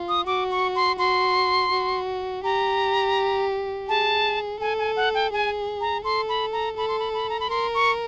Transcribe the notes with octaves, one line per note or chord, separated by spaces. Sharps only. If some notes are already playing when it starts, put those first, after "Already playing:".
Already playing: F4
D#6
F#4 D6
C#6
C6
F#4 C6
F#4
G4 A#5
G#4 A5
A4 G#5
G#5
F#5
G5
G#4 G#5
A#5
A4 C6
B5
A#5
A4 B5
C6
B5
B5
A#5
B5
A#4 C6
C#6